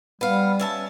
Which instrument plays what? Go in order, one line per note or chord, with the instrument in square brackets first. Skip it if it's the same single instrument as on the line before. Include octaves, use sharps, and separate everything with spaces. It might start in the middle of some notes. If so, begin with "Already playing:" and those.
[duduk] G3 [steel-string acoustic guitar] B3 F5
[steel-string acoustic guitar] C#4 E5 A5